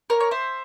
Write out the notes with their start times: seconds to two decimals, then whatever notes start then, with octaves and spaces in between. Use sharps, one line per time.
0.10 A#4 C#5
0.20 C#5
0.31 C5 E5